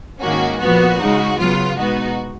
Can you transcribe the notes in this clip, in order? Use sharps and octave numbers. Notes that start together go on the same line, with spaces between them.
G#2 D#3 A#3 C#4 F#4
A#2 F3 B3 F#4
C#3 G#3 D#4
C#3 F#3 B3 F4
B2 G#3 B3 D#4 F#4